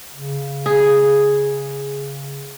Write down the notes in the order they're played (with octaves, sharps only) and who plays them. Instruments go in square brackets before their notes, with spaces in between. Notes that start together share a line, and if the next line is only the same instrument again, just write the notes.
[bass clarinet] C#3
[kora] G#4